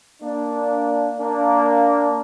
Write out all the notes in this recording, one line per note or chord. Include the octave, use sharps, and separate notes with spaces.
A#3 D4
A#3 D4